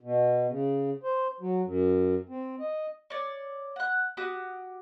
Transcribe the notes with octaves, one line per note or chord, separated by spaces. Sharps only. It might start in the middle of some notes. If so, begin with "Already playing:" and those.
B2
C#3
C5
F#3
F#2
C4
D#5
C#5 D5
F#5 F#6
F#4 G4 D#6